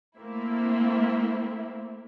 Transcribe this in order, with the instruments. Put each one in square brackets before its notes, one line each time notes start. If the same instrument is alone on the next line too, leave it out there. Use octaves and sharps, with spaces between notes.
[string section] A3 A#3 C4 E4